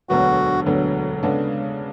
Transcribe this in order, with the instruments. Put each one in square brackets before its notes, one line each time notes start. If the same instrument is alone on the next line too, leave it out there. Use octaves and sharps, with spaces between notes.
[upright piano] E1 D2 D3 F#3 B3 [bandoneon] F#4
[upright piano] E1 D2 D3 F#3 B3
C#3 G#3 B3 D4 A4